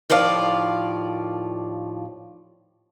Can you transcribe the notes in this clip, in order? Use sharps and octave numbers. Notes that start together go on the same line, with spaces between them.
D#2 A2 F3 D5 F5